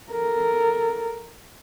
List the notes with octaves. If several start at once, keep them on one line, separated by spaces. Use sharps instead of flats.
A4 A#4